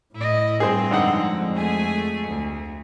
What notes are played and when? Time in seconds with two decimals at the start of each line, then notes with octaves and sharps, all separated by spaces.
0.15 A2 E4 D#5
0.60 G2 C4 G#4 C5
0.91 F2 D3 G#3 D#4 F#5
1.54 A3 G#4 G#5
2.27 D2